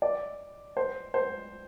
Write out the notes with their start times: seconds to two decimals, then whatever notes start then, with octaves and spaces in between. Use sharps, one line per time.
0.02 D5
0.77 C5
1.14 C5